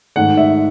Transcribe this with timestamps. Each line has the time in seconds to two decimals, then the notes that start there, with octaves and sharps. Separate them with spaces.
0.16 G#2 D#3 A3 F#5
0.37 E5